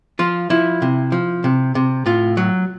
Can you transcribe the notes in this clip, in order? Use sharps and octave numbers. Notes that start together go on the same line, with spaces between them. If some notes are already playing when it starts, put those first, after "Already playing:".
F3 F4
F3 E4
C3
F3
C3
C3
A2 F4
F#3